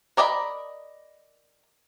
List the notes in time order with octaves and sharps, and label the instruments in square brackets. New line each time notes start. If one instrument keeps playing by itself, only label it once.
[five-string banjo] A#4 D5 D#5 G5 B5